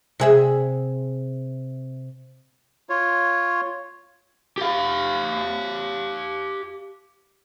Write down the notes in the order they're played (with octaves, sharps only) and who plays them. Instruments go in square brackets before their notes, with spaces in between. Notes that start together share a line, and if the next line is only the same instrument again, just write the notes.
[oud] C3 G#4 E5
[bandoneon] F4 C#5
[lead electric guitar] G4 F5